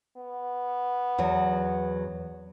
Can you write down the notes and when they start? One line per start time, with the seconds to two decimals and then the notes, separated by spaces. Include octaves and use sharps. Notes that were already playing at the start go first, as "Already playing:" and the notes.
0.17 B3
1.18 E2 F#3